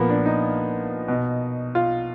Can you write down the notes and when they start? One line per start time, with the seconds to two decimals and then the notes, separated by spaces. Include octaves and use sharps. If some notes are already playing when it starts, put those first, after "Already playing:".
Already playing: A#2 F3 A#3 B3
0.09 D4
0.26 D#4
1.08 B2
1.75 F4